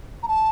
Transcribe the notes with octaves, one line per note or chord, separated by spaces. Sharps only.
A#5
A5